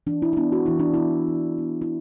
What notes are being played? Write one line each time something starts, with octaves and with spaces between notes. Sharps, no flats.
E3 D4
E4
E4
B3 D4
F#4
E3 E4
D4
B3 E4
E3
B3
E4